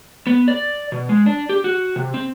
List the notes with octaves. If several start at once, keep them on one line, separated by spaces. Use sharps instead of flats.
B3
D5
B2
G#3
D4
G4
F#4
C3
C4